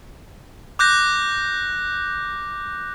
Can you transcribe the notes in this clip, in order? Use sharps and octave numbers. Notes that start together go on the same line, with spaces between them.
D6 F#6 G6 A#6